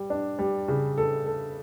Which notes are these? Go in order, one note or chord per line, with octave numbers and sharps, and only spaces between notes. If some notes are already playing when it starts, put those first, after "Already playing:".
Already playing: G3
D4
G3
C#3
A4
A4